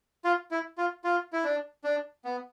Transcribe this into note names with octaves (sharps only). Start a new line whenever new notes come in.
F4
E4
F4
F4
E4
D4
D4
B3